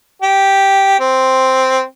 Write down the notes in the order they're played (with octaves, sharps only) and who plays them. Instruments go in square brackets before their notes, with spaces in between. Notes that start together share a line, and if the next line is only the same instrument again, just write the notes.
[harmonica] G4
C4